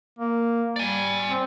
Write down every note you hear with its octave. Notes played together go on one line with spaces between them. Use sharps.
A#3
G3 D5 G#5
C4